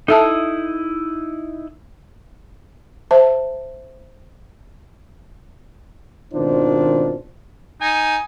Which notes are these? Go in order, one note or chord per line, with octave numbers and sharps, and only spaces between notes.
D#4 E4 A4 E5 A5 D#6
C5 E5 A5
G#1 B2 D#3 D4 F4 C5
D#4 G#5